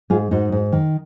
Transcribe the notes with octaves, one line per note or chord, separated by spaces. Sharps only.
G#2 F4 G#4
G#2 D#4 F#4
G#2
D#3